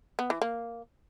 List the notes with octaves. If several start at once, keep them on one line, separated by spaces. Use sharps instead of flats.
B3
E3
A#3